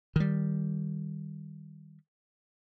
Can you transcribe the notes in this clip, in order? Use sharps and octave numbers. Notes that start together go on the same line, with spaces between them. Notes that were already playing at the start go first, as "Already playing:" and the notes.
D#3 G3